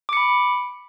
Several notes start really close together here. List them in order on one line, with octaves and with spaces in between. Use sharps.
D6 C#7 B5